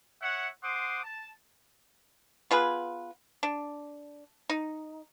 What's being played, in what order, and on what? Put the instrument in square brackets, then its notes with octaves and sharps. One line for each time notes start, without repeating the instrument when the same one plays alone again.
[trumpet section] C#5 E5 F#5
C5 F#5 C6 D6 D#6
A5
[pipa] B3 F4 G#4 B4
D4
D#4